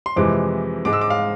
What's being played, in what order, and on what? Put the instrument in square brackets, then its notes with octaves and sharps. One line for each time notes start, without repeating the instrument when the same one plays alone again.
[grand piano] C6
F2 C3 E3 G#3 D6
G#2 G#3 D6
E6
D6
F5